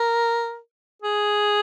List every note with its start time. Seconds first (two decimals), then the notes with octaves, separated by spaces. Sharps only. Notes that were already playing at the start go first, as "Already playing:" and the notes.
Already playing: A#4
1.02 G#4